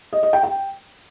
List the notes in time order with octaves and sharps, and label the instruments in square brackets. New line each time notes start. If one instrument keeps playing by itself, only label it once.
[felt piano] D#5
D#5
G5
G5